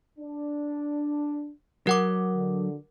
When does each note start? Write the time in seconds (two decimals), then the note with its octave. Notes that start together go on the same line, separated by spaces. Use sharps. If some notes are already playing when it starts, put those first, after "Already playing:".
0.19 D4
1.87 F#3 A#4 F#5 D6
2.34 D3